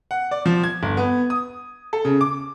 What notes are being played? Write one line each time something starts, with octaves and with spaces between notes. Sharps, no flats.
F#5
D5
F3
G#6
G1
B3
D#6
A4
C#3
D6